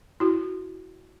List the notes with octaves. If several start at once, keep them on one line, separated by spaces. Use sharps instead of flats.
E4 F#4